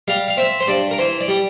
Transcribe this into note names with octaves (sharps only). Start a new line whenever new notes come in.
G3 F5
F5
C4 E5
C5
G2 D5
A#4
E3 C5
D5
G3